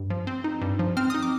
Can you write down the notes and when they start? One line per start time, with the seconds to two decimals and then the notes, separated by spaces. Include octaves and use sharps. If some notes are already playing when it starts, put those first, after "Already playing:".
Already playing: G2
0.10 F3
0.27 C4
0.44 D#4
0.62 G2
0.79 F3
0.97 C4 F6
1.10 D#6
1.14 D#4
1.23 D6